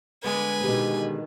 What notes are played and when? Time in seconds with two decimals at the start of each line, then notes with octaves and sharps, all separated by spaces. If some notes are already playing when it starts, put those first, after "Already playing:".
0.24 D3 G#3 B3 B4 G#5
0.62 B2 D#3 G4